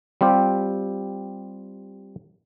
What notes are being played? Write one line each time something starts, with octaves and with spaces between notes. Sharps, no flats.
G3 C4 F4 G4